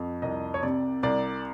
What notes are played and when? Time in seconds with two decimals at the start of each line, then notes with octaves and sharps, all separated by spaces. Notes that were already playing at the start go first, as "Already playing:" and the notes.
Already playing: F2
0.22 C2 D#5
0.54 C#5
0.63 C3 D5
1.03 C2 D5